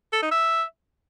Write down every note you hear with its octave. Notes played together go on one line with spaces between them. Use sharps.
A4
D#4
E5